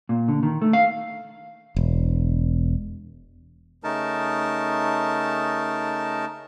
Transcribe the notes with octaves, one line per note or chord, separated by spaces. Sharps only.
A#2
D3
D#3
A3
F5
E1
C#3 A3 D#4 A#4 A5